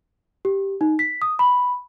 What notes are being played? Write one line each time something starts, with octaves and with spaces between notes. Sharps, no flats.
G4
D#4
B6
D#6
B5